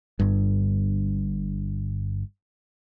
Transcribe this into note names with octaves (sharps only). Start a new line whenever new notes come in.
G1 G2